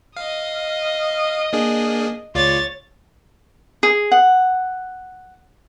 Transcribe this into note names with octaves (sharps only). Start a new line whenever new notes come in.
D#5 F5 D#6
A#3 D4 G#4
C#2 F4 C#5 D5 A6
G#4
F#5